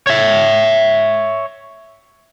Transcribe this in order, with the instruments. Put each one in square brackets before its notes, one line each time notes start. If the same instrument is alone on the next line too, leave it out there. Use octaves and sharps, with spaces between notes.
[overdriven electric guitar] C#5 E5